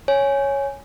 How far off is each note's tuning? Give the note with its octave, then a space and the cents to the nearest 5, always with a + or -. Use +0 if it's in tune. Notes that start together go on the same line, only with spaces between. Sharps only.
C#5 +0 G#5 +0